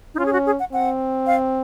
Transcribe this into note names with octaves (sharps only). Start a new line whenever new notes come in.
D#4
C#4 F4
G#4
F#4
G#4
F#5
C4 F#5
F5